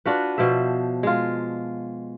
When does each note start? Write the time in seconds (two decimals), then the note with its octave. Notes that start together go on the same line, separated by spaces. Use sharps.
0.05 D4 F4 F#4 B4
0.38 B2 F3 C5 E5
1.03 G#3 F4